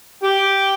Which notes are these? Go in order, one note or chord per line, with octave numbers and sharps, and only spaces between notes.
G4